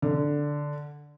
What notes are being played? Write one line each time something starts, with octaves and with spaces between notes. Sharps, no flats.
D3